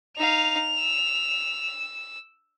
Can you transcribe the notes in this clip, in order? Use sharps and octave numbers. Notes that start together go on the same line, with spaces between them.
D#4 F5 F7
E6